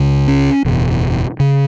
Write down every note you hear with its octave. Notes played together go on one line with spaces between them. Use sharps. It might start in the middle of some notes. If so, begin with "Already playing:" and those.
Already playing: C#2 C#3
C#4
F#1 E2 B2
C#3